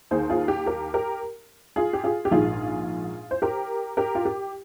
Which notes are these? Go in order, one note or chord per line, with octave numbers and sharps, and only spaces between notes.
D#2 D#3 G#4 C5
F4 G#4
G4
G4 A#4
G4 A#4
F4 G#4
G4
F4 G#4
G4
A#1 G#2 D#3 F4 G#4
C5
G4 A#4
G4 A#4
F4
G4